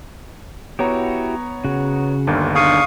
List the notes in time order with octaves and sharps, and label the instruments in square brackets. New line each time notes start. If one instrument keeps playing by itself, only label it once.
[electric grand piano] B3 C#5 A#5 [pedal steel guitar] E4 F#4 G4
[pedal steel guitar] C#3 F#4
[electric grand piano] G1 D#2 D3
[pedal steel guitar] D4 D#4 G#4 [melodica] F5 C#6 D#6